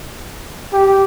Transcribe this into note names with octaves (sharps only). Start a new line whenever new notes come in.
G4